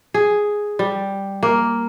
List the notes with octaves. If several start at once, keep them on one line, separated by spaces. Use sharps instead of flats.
G#4
G3
A#3